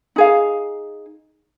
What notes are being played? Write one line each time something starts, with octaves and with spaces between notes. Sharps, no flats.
D#4 G#4 F5